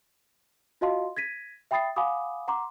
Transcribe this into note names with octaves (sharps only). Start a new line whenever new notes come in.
F4 F#4 D#5 F5 A5 C6
G#6 A#6 B6 D#7
E5 G5 B5 D#6 A6 C7
F5 F#5 G#5 B5 D6 D#6
F#5 A#5 C6 D6